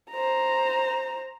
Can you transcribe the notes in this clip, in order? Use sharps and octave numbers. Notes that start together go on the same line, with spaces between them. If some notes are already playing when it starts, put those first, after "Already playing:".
C5 A#5